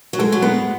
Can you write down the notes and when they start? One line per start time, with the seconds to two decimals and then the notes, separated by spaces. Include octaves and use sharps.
0.13 F#3
0.19 G#3 A4
0.32 F#3
0.42 G#3 B3